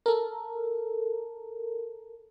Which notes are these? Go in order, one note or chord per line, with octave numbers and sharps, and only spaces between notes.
A4 A#4